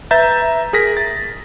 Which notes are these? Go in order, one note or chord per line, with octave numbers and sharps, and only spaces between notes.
B4 E5 A#5 G6 A6
G#4 A#4 A#6 B6
A6